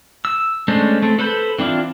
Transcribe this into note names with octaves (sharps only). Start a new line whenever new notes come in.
E6
G#3 A3 C#4 D4 C5
A3 C4
A4 B4 C5 B5 G6
E3 C4 D4 E4 F4